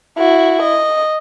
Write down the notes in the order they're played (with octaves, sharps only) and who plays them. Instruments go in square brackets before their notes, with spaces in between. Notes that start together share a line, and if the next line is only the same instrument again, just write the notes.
[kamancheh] E4 F#4
D#5